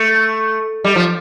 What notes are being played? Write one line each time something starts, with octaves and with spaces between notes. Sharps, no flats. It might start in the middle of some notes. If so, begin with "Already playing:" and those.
Already playing: A3
G3
F3